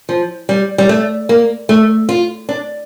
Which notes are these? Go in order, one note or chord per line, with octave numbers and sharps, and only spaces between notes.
F3
G3
G3
A3
A#3
A3
F4
D4